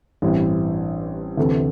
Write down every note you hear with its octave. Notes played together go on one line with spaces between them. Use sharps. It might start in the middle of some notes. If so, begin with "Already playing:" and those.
A1 G2 G3 C4 E4
D2 C3 E3 C4 A4